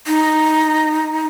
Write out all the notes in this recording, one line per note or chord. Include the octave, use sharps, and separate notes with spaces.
D#4